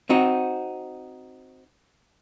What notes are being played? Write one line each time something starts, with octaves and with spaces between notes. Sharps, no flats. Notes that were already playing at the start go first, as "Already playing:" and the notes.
C4 D#4 F#4